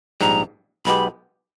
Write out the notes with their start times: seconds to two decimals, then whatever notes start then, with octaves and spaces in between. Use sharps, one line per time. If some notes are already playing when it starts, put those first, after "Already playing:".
0.21 A#1 G#2 G3 A#5
0.85 B1 B2 G#3 B3 G4 B5